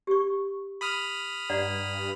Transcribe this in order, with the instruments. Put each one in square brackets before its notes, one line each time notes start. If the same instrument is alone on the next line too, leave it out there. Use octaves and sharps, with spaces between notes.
[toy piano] G4 C#6
[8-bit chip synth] B5 D#6 F6
[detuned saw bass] G2 [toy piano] D5 F#5 A#5
[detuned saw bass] G2